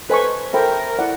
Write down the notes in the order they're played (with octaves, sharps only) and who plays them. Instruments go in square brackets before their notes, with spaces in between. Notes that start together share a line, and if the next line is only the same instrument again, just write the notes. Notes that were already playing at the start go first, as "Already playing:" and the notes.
[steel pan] A4 C5 D#5 G#5 C#6 [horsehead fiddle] B4
[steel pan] A4 C5 E5 G5 B5 [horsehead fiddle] A#4
[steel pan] E4 A4 D5 F#5